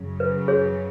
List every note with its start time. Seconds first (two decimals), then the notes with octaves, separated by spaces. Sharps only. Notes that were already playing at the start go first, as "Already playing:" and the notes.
Already playing: F#2 C#3 F#3
0.20 B4
0.48 G#4 C#5